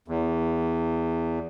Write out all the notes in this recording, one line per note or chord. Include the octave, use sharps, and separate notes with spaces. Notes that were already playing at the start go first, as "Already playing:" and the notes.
E2